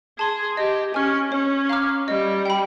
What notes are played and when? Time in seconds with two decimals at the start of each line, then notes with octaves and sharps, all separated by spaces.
0.18 G#4 A5 C6
0.57 G4 D#5
0.94 C#4 G#5 C#6 F6
1.32 C#4 C#5
1.69 F5 A#5 D6 F6
2.08 G3 D#5
2.46 G5 B5